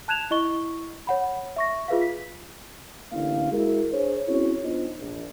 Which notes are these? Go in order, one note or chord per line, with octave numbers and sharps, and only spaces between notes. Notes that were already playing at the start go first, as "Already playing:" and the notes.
A5 F#6 G#6 E7 F7
E4 D#5 C#6 G7
C#5 F#5 B5
E5 C#6 A#6
F4 G#4 B4 E5 F5
B6
A1 D3 A#3 E4 F5
G#3 E4 F#4 G#4 A#4
D4 G#4 C5 C#5
C4 C#4 E4 F#4 G#4 C#5
B3 D4 D#4 F4 C5 D#5
A#1